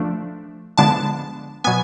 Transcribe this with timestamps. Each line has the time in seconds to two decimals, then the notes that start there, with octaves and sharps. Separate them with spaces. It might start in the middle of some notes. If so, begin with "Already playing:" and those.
Already playing: F3 A3 D4
0.78 D3 F3 G#3 B3 D4 A5
1.64 B2 F#3 B3 G#5